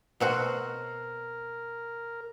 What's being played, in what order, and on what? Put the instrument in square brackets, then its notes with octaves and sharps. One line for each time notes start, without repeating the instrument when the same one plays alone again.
[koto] B2 C4 F#4 [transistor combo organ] A#4